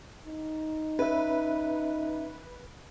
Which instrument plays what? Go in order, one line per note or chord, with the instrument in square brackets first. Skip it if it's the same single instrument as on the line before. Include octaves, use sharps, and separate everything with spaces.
[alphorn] D#4
[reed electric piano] C#4 E5 [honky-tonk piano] B4